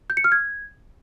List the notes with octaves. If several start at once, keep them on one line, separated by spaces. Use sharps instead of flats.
G6
C#7
F6
G#6